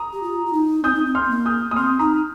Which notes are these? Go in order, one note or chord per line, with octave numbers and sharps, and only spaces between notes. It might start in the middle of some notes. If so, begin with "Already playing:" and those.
Already playing: A#5 D#6
G4
F4
F4
D#4
C4 D#6 G6
D#4
C4
C6 F6
C4
A#3
D#6 G6
D#6
C4 C6 F6
D#4 A#5 D#6